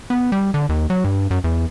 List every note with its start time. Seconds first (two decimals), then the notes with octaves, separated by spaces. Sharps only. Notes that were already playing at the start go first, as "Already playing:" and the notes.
0.10 B3
0.32 G3
0.54 D3
0.69 D#2
0.90 F#3
1.04 G2
1.31 F#2
1.44 E2